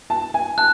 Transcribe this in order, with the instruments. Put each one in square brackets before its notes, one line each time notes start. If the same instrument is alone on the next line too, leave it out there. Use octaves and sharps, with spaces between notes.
[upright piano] A5
G#5
[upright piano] A5 [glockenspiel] F#6